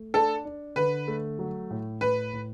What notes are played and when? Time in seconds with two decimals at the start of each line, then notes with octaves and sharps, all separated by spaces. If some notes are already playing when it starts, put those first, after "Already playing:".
Already playing: A3
0.14 D4 A4
0.45 D4
0.76 D3 B4
1.08 A3
1.39 F#3
1.71 A2
2.01 A2 B4
2.33 A2